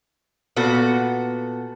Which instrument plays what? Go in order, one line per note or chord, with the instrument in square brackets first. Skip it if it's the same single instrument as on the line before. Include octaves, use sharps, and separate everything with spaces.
[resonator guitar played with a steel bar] A#2 B3 F#4 A4